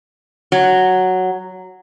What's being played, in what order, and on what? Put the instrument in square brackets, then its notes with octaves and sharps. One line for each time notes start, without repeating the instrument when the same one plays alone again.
[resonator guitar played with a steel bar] F#3